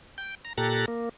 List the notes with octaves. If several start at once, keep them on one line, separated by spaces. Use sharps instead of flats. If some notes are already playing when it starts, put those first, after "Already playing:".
G5
A#5
A#2 G4 A4 A#5 F#6 A6
A#3